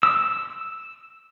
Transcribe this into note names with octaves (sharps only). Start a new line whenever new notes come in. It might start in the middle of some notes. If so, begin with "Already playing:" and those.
E6